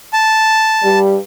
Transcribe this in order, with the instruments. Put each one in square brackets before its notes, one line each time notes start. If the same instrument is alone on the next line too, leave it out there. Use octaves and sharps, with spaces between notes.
[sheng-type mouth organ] A5
[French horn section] G2 G3